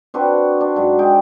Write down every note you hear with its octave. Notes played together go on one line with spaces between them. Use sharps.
C4 D4 F#4 B4
D4
G#2 F#3
G#3 G5